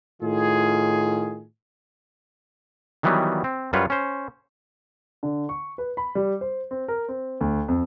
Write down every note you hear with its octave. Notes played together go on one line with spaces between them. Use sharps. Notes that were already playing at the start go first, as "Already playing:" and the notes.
A2 D#3 F4 G#4
D#3 E3 F#3 G3 B3
C4
F#2 G3 F4 B4 C#5
C#4 C5
D3
C#6
B4
B5
G3
C5
C4
A#4
C4
D2
F2